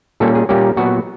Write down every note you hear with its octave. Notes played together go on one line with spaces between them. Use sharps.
A#2 G3 A#3 C#4 A4
G#4
A#2 G3 A#3 C#4 G4
A#2 F#3 B3 F#4